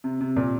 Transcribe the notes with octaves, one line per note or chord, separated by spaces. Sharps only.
C3
C3
A#2